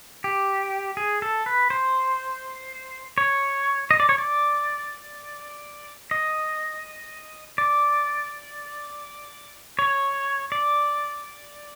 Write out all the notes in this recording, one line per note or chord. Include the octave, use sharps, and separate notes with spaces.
G4
G#4
A4
B4
C5
C#5
D#5
D5
C#5
D5
D#5
D5
C#5
D5